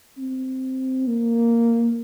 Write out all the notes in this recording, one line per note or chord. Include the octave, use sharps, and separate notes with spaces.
C4
A#3